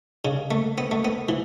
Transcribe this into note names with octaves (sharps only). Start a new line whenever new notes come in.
C#3
A3
B3
A3
B3
E3